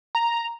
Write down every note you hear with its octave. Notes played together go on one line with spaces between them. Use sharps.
A#5